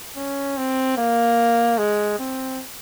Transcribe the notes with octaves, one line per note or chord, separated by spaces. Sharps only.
C#4
C4
A#3
G#3
C4